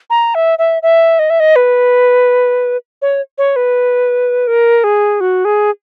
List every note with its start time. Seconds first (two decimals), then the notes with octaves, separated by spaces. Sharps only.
0.10 A#5
0.35 E5
0.59 E5
0.83 E5
1.19 D#5
1.30 E5
1.40 D#5
1.56 B4
3.02 C#5
3.38 C#5
3.56 B4
4.47 A#4
4.84 G#4
5.20 F#4
5.45 G#4